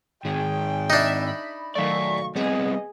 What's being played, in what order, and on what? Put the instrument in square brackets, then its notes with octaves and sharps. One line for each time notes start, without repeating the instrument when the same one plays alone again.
[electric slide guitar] G#2 D#3 [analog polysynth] G#4 [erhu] G5
[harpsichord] D4 D#4 [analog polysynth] E5 B5
[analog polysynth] B5
[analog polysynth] D#3 F#3 A3 [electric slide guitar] D5 F5 [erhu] C#6
[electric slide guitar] G3 B3 C4 [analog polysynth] G#4 [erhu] D#5